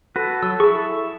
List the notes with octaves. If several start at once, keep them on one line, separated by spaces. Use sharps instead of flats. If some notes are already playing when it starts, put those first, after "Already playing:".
F#4 A4 B4
F#3 E6
E4 G#4 C#6